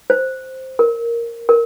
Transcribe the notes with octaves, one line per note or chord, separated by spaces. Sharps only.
C5
A#4
A#4